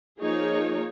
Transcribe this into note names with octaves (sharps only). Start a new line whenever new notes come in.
F3 A#3 D#4 G#4 C#5